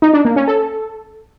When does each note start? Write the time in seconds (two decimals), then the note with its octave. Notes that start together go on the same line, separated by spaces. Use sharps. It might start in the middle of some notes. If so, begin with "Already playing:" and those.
0.02 D#4
0.14 D4
0.25 A#3
0.36 C#4
0.48 A4